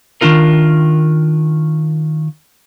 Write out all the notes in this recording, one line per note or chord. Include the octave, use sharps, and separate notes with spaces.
D#3 C#4 D4 F4 A#4